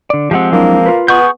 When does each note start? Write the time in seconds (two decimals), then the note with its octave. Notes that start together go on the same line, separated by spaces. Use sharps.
0.10 D3 D5
0.31 F3 G#3 C4 G4 F#5
0.53 F#3 A#3 D4 E4
0.86 F4 B4
1.08 B3 G#4 C#6 G6